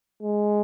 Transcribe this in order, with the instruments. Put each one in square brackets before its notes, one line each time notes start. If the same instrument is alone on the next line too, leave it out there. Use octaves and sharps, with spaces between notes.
[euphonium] G#3